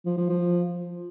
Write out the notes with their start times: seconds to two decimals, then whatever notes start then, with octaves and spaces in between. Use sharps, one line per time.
0.06 F3
0.18 F3
0.29 F3